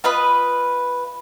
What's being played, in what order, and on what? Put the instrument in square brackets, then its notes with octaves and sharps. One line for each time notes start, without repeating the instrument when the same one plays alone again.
[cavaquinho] F4 B4 D#5 B5